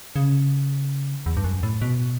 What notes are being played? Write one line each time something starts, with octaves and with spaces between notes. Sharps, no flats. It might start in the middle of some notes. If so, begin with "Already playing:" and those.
C#3
E2
G2
F#2
A2
B2